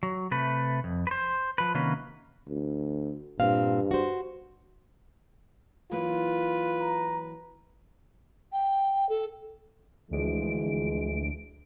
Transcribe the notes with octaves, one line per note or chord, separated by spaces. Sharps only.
F#3
C3 A3 B4
F2
B4 C5
F3 B4
C3 D#3 F#3 A#3 C#4 B4
D2
G2 A#2 C4 F5
F#4 C5
E3 F#3 A#3 F4 B4
A#5
G5
A4
D2 E3 F3 G#3 D7